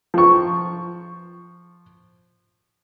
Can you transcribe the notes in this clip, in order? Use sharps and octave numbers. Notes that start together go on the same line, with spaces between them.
F3 C#6